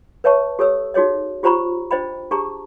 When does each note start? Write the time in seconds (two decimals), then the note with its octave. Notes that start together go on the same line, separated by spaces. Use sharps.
0.24 B4 C#5 E5 A5 C#6
0.59 G4 A4 C#5 E6
0.94 D#4 F#4 G#4 C#5 D#5
1.43 F4 G4 C5 A#5 B5 C#6
1.91 D4 C5 D#5 G5 B5
2.31 D4 G4 G#4 A5 A#5 C#6